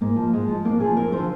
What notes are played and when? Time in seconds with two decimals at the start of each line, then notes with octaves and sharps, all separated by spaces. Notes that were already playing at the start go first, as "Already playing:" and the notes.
0.01 G#2 A#3
0.16 F3
0.33 G#2 G#3
0.48 F3
0.65 F2 A#3
0.80 D3 F3 G#4
0.96 F2 A#4
1.12 D3 F3 C5